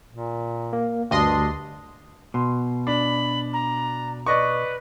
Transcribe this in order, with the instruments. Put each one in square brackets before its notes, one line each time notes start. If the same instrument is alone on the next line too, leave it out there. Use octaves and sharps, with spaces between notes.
[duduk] A#2
[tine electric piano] A#3
[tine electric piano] D2 [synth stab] G2 D#5 C6 [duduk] D4
[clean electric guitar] B2 [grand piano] C6
[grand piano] D4 [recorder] B5
[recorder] A#5
[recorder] B4 [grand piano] D5 D#5 C#6